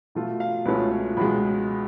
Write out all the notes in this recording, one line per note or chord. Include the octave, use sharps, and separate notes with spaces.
B2 A3 F4
F5
C#2 B2 A3 C#4 F4 B4
C#5
C#2 B2 G#3 B5